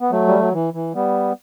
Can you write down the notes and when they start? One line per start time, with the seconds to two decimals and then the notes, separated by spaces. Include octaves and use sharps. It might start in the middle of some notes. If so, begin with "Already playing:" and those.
0.01 B3
0.11 F#3 A3
0.27 G3
0.40 F#3
0.53 E3
0.74 E3
0.94 G3 B3